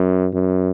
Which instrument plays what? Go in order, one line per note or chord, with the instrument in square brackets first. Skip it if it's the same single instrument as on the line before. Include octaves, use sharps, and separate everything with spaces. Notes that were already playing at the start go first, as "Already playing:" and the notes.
Already playing: [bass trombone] F#2
F#2